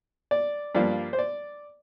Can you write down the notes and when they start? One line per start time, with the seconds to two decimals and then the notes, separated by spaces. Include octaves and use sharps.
0.31 D5
0.75 G2 F3 A#3 D5
1.13 C5
1.19 D5